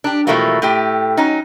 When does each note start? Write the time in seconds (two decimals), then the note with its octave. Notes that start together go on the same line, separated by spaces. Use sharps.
0.04 D4 G4
0.27 B2 E3 F3 G3 A3 A#3
0.62 A2 A3 G4
1.17 F#3 C#4 D#4